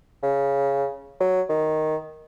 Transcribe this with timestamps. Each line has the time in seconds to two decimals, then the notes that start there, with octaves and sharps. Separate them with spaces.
0.23 C#3
1.20 F#3
1.49 D#3